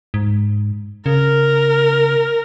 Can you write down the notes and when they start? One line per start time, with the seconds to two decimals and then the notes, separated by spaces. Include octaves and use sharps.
0.14 G#2
1.06 C#3 A#4